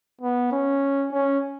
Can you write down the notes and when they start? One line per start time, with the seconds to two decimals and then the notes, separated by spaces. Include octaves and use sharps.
0.21 B3
0.52 C#4
1.12 C#4